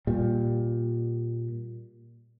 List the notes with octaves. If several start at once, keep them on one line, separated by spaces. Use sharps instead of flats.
A#2 G3